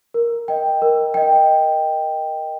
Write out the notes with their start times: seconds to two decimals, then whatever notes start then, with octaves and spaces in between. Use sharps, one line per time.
0.14 A#4
0.48 D#5 G5
0.82 A#4
1.14 D#5 G5